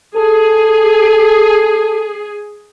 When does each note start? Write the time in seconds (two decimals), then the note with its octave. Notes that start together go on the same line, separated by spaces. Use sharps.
0.16 G#4 A4